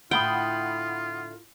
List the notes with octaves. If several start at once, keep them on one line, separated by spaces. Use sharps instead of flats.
A2 D3 A3 F4 F#5 G5 B5 D#6